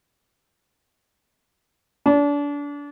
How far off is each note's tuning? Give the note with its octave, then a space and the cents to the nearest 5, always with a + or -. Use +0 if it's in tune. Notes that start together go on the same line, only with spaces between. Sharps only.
D4 -30